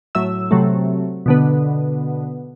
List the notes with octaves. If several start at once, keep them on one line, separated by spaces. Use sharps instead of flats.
A2 F#3 E5 E6
C3 F#3 A3
B2 D3 B3